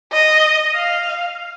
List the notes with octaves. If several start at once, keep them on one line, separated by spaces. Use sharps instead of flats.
D#5
F5